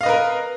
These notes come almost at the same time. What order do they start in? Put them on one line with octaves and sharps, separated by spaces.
F5 D#5 B4 A#4